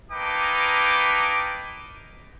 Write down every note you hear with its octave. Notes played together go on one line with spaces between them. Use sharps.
A#3 D#4 B4 G5 A5 D6